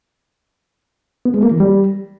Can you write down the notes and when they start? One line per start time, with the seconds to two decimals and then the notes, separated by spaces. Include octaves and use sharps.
1.25 B3
1.34 G#3
1.43 A#3
1.51 E3
1.60 G3